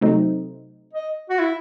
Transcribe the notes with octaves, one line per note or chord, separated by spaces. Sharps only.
C3 F#3 A3 C4 D#4
D#5
F#4
E4